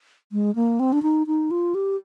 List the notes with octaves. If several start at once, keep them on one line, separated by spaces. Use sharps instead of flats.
G#3
A#3
C4
D4
D#4
D#4
F4
G4